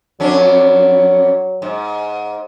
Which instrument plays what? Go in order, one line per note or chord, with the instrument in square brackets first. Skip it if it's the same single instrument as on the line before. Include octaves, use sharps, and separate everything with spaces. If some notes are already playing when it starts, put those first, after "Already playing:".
[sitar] F2 C#4 D4 [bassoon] F#3
[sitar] G#2